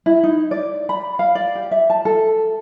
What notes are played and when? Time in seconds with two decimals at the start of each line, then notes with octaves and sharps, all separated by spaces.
0.06 E4
0.23 D#4
0.51 D5
0.89 B5
1.19 F5
1.35 D5
1.55 G4
1.71 E5
1.90 A5
2.05 A4